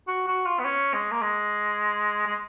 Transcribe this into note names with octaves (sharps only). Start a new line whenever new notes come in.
F#4
F#4
F4
B3
C#4
G#3
A#3
G#3
G#3